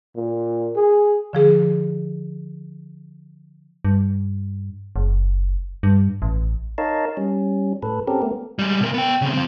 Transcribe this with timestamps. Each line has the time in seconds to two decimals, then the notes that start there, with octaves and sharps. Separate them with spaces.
0.16 A#2
0.76 G#4
1.33 D3 F3 G#4
3.85 G2
4.96 F#1
5.83 G2
6.22 A1
6.78 D#4 A#4 C#5 D#5 F5 A5
7.17 G3 C#4
7.83 A2 A4 B4
8.07 C4 C#4 G4 A4 A#4
8.22 A3 B3
8.59 G3 G#3
8.81 B2 A#4
8.94 B3 G5
9.22 C#3 C4
9.34 F3 C4